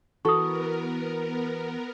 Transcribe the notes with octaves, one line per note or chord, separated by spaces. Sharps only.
E3 B3 F#4 A4 A#4 C#6 D#6